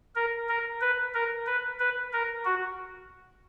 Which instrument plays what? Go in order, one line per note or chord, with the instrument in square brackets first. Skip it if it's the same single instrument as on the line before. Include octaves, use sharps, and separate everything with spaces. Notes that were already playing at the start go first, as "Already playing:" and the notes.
[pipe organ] A#4
A#4
B4
A#4
B4
B4
A#4
F#4